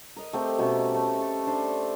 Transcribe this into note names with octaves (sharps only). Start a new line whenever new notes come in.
A#4 D#5
A3 C4 G4 A#4
B2 A3 C#4
A3
A4
D4 C5